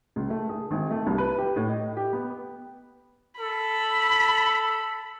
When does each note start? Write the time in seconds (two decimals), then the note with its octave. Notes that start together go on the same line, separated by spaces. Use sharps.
0.16 C#2
0.30 A3
0.49 G#4
0.71 G#1
0.91 A3
1.07 C2
1.18 B4
1.38 G4
1.56 A2
1.69 D#5
1.97 G4
2.13 B3
3.40 A4 B5